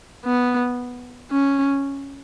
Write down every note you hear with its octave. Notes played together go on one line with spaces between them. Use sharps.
B3
C#4